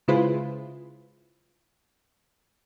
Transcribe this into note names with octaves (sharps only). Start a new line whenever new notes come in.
C#3 G#3 E4 F4 B4 C5